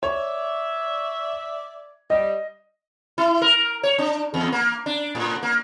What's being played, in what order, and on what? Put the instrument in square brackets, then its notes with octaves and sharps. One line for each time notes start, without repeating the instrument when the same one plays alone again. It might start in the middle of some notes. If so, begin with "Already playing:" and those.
[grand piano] C#5 [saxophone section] D5 E5
[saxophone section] G3 [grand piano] D#5
[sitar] E4
A#4
C#5
D4
E2
A#3
D4
A2
A#3